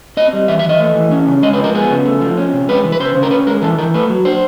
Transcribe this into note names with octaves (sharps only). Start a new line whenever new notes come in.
C4 D#5
G3
E3 E5
E5
E3
D#5
A3
E3
C#4
C#3
G#3 D#5
B4
F3
A#4
B3 G#4
C#3
A3
F3
C#4
C3
G#3 B4
E3
B4
C#3 C5
C#3
A#4
C#4 B4
G#3 A#4
E3 A4
E3 A#4
A3 B4
F#3
D4 C5